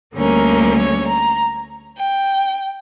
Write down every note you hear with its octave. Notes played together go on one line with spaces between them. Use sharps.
D2 D3 G3 A#3 C#4 A#4
C#5
A#5
G5